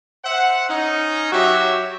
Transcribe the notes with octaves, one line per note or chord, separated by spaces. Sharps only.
C5 E5 F#5
C#4 D#4
F#3 F#4 G4 C#5 E5